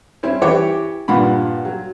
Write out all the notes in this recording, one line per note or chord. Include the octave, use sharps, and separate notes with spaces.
C4 C#4 E4
E3 G4 C#5 D6
G2 A#2 F#5 B5
F#3